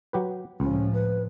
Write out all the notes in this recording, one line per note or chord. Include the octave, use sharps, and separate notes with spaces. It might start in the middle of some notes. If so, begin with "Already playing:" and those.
F#3 G4 B4
C#2 A2 C3 F3 C#4
B4